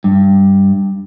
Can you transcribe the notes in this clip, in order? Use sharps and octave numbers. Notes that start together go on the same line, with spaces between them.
G2